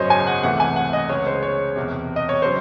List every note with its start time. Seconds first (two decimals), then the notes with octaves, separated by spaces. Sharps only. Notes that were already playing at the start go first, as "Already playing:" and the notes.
Already playing: G#1 F#2 C#3 F#3 C5 C#5 D#5
0.10 G#5
0.27 F#5
0.43 C#2 C3 E3 A3 F#5
0.60 G#5
0.76 F#5
0.93 D#5
1.09 C#2 C#3 G#3 C#5
1.26 C5
1.43 C#5
1.76 E1 E2 C3
2.16 D#5
2.29 C#5
2.42 C#3 F#3 C5